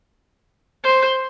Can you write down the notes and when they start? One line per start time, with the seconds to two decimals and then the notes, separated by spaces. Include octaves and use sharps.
0.84 C5